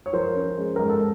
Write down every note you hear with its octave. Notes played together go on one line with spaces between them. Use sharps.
C#5
F3 A#4 C5
C#4
G#3
G#2 A#4
A4